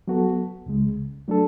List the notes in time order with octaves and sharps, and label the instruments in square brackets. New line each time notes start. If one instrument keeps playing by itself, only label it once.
[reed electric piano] F#3 B3 F#4 A4
C#2 C#3 G#3
F#3 A3 D4 A4